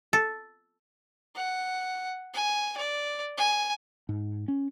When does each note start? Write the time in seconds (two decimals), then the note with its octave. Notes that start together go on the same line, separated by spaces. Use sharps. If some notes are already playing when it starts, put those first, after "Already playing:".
0.13 A4
1.36 F#5
2.34 G#5
2.77 D5
3.37 G#5
4.09 G#2
4.48 C#4